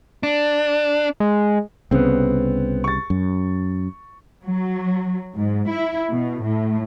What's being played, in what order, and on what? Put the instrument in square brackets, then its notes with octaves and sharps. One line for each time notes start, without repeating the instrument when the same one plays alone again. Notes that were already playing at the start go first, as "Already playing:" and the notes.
[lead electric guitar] D4
[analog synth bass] G#3
[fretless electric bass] C2 C#3 [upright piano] B3 C4
[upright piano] C#6 A6
[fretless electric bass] F#2
[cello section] F#3
G#2
E4
B2
A2